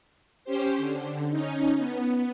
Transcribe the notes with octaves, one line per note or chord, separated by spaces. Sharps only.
C#4 G4 C5
D3
C#4 D#4
B3